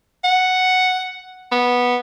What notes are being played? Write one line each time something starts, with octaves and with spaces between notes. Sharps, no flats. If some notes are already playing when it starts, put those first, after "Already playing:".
F#5
B3